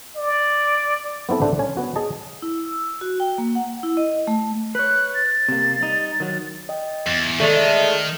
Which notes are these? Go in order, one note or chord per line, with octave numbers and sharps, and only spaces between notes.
D5
B3 C4 E4 A4
D4 A4 C5 D5 E5 F#5
C#4 G#5
B3 F#4
G#4 D#5 A5
E4
E6
F#4
G5
A#3
F#5
E4
D#5
A3
B4 C#5 F#6
A6
C3 A#3
G3 D#4
D#3 F#3
D#5 G5
E2
D#3 G#3 A3 A4 D5 E5